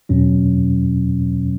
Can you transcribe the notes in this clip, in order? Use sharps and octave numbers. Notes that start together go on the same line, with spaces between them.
E2 B2 F#3 C#4